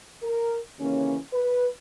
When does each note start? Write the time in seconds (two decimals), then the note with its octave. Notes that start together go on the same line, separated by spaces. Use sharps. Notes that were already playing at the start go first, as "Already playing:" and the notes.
0.23 A#4
0.77 D#2 C#3 E3 A#3 C#4
1.33 B4